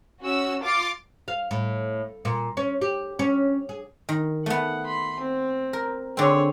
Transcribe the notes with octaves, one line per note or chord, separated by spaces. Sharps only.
C#4 F#4 E6
F4 D6 A6 C7
F5
A2
A#2
C#4
G4
C#4
G#4
D#3
A3 B3 F#5
B5 C6
C4
A#4
D3 C4 G#4 C#5